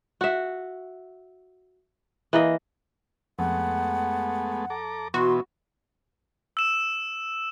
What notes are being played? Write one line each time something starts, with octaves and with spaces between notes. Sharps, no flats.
F#4 E5
E3 A#3 D#5
F2 G#3 A3 B3 F#5
A4 A#5 D6
B2 E3 B3 F#4 C6
E6 E7